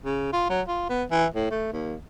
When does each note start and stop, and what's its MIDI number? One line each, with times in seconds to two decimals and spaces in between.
0.05 0.29 49
0.33 0.45 65
0.50 0.62 54
0.68 0.85 65
0.90 1.04 59
1.11 1.26 52
1.34 1.49 45
1.51 1.70 57
1.73 1.96 39